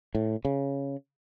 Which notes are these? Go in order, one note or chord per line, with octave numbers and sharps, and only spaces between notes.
A2
C#3